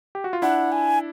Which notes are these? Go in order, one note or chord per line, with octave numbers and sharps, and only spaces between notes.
G4
F#4
F4
D4 E4 F#5
G#5